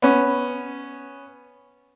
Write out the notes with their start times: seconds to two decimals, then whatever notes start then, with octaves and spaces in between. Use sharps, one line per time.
0.02 B3 C#4